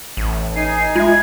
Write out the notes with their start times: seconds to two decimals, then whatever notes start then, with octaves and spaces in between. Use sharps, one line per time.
0.17 A1
0.56 D#4 G#5 C7
0.95 G#3 F4 E5 G#6